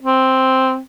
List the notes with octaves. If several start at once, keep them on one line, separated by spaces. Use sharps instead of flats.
C4